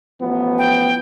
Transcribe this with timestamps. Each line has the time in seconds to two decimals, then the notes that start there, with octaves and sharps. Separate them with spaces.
0.21 A1 F3 B3
0.58 G5